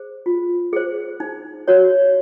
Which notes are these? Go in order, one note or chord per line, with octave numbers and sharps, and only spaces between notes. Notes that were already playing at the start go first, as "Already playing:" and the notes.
Already playing: G#4 C5
F4
G#4 C5
D#4
F#4 C#5